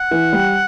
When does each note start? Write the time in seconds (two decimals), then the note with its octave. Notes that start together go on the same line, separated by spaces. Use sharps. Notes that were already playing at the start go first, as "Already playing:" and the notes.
Already playing: F#5
0.11 E3
0.33 G3